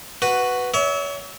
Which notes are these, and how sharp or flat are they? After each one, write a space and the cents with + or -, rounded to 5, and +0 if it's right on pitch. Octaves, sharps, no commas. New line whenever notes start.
F#4 +0 B4 +5
C#5 +35 E5 -25